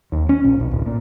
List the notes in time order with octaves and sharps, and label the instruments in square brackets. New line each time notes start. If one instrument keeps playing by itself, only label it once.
[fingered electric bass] D#2
C#4
A#1
B1
D1
A#2